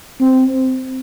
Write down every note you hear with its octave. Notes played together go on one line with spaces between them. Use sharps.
C4